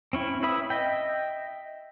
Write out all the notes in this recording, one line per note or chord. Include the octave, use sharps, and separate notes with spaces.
C4 C#4 E4
E4 B4 E5 B5 D#6
D#5 E5 G5